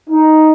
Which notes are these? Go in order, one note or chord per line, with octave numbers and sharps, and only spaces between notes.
D#4